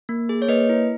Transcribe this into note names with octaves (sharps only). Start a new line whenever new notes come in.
A#3
G#4
C#5
A#3 B4 D#5
E4